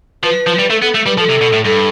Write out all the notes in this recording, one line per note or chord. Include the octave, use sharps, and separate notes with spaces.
F3 B4
F3
G3
A3 A4
B3 A4
A3
G3 B4
F3 A4
C3
B2
A2
G2 A4